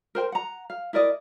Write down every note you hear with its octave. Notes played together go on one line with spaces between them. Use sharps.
A#4 C5 G5
F#5 A#5
F5
E4 A#4 D5 D#5